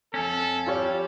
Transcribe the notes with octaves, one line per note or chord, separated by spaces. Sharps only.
F2 C#4 A4
G3 F4 G4 C#5